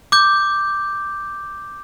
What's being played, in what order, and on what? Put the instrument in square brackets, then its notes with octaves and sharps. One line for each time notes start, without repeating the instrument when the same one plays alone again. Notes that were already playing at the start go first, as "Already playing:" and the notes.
[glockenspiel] D6 G6